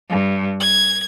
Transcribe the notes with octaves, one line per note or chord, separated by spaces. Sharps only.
G2
G#6